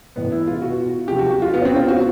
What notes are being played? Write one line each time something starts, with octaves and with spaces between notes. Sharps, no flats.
A2 E3 B3
E4
F4
B2 F#4
C3 F3 G4
F#4
F#4
F4
B2 B3
C#4
C4
F4
F#4